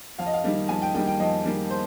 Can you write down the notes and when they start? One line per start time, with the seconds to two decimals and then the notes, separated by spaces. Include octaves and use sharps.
0.19 F2 F5
0.26 D#5
0.33 F5
0.44 D#3 G3 A#3
0.69 F2 G#5
0.82 G5
0.94 D#3 G3 A#3 G5
1.07 G5
1.20 F2 D#5
1.45 D#3 G3 A#3
1.70 C5